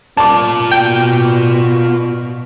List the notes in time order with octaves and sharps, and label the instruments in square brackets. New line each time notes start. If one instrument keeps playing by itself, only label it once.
[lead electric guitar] F4 D5 [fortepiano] A5 D6
[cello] B2 [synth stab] G5